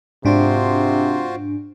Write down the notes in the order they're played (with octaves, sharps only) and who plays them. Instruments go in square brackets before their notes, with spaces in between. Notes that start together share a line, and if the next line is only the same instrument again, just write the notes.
[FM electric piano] G#2 D4 [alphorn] C3 [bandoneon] F4 F#4 C5